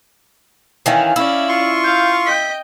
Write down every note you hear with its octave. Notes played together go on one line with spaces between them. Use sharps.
D#3 E3 C#4 F5
C#4 E4 D5 E6
F4 C6 C#6
F5 G6
D#5 G5 B6